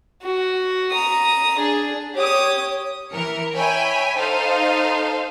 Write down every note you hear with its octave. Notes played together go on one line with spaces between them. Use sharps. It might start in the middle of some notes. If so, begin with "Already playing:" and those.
F#4
A#5 D#6
D4 G#4
G4 C#5 D#6
E3 A#4 C#7
C#5 E5 G5 G#5 B5
D#4 A4 C5 F5